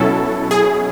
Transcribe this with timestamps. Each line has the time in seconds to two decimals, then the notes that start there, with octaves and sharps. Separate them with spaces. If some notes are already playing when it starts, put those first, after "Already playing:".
Already playing: B2 F#3 C#4 E4 A4
0.51 G#4